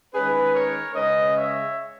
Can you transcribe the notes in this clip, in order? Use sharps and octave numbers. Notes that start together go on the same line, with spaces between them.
D#3 G#3 C#4 G#4 B4
A#4 C#5
C#3 G#3 C#4 B4 D#5
C#5 E5